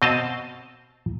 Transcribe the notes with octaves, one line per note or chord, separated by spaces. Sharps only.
B2 C4 D#5 F5 A5